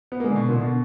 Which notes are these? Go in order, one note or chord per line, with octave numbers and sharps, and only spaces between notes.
B3
A#3
G#3
D3
B2
A#2
D3
B2